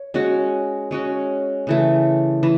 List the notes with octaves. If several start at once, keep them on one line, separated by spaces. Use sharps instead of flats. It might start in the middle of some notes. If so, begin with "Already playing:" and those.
Already playing: C#5
G#3 C#4 F#4
G#3 C#4 F#4
C#3 E3 A3
E3